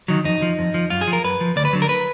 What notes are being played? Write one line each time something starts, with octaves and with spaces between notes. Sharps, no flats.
D#3 F#3
F2 D#4
F3
F2
F3
F#2 F4
G#4
F3
A#4
F#2 B4
F3
D2 D5
B4
D3 F#3
A#4
B4